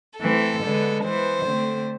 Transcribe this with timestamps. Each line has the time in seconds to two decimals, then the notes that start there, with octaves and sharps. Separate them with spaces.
0.21 E3 A3 C4 A4
0.63 D3 G#3 B3
1.04 E3 B3 C5
1.46 D3 A3 C4